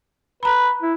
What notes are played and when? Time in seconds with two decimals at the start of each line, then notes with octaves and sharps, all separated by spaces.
0.43 B4 A#5 B5
0.82 E4